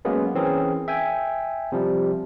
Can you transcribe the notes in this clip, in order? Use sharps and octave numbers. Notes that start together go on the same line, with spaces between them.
F#3 G#3 A#3 B3 C#4
E3 C4 C#4 G#4 A#4
E5 G5 G#5
C3 F3 G3